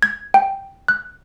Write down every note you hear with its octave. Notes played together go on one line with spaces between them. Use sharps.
G#6
G5
F#6